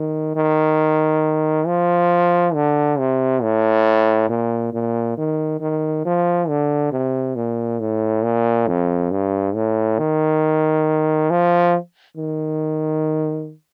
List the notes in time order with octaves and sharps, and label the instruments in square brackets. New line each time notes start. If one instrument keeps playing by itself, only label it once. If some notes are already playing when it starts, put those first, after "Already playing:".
Already playing: [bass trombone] D#3
D#3
F3
D3
C3
A2
A#2
A#2
D#3
D#3
F3
D3
C3
A#2
A2
A#2
F2
G2
A2
D#3
F3
D#3